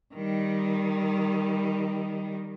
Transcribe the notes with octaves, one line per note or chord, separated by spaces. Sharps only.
D#3 G3